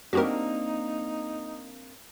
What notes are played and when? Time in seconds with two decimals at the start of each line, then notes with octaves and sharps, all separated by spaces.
0.13 A#3 C4 D4 D#4 F#4 G4 A#4